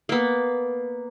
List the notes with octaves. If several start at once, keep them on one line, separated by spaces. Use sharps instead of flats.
A#3 B3